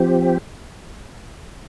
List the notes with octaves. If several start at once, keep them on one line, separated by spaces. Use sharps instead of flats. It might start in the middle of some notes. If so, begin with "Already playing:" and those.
Already playing: F3 C4 G4